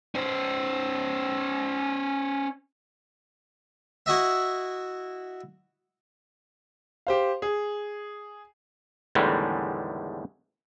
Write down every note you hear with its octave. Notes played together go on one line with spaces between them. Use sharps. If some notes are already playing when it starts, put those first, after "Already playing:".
C#4 C5
E4 F#4 D#5 E5
G4 C5 F5
G#4
E2 A2 D3 D#3 G3 G#3